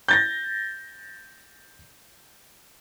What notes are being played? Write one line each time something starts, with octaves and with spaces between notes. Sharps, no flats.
G6 A6 A#6